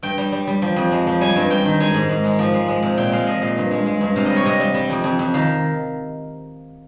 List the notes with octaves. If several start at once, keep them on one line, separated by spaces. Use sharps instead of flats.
G2 G5
G3
G3
G3
F3
F2
G#3
F3
G3 G#5
G2
G2 G5
D#3
G#3 G#5
G#2
G#2
G#3
F3
G#3
G#3
C3
A#2 G5
G#3 F5
F3 D#5
A#2 F5
G2
G#3
G#3
G2
C3 F5
G3 D#5
C#5
C3 D#5
G3
G3
F2
F2
F2
D#3 F5